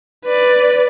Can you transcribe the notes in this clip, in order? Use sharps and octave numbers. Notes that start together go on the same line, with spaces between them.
B4 D5